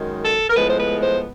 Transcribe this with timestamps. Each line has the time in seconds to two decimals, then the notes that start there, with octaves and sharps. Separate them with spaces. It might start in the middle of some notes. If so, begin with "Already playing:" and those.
Already playing: F#2 D#3 G#3
0.25 A4
0.50 A#4
0.56 A2 F3 G#3 B3 B4
0.69 C5
0.80 B4
1.03 C5